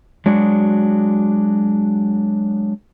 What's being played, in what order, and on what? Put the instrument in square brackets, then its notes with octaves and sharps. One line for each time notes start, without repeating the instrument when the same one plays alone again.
[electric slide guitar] F#3 G#3 D4 F#4